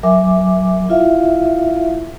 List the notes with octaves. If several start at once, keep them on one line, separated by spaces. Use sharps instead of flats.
F#3 A#4 E5 G#5 D6
E4 F4 E5 F5